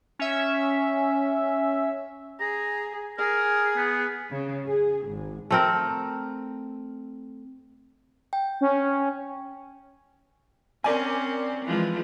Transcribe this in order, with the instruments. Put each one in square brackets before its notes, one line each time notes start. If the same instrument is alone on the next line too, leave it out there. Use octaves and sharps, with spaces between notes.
[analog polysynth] C#4 E5
[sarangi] G#4 [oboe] A#5
[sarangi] G#4 [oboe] A#4
[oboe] B3
[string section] C#3
G#4
G#1
[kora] A3 C4 A#4
[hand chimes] G5
[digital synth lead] C#4
[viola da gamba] C4 C#4 [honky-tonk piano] A#4 D5 G#5
[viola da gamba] E3 F3 G#3